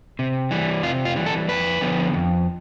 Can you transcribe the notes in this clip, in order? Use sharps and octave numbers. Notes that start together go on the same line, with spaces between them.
C3
E3 G3
C3 F4
F4
E3 G3
A4
F2 B4
D3 F3 B3
F2